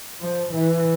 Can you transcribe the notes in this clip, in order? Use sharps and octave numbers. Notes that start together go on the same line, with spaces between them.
F3
E3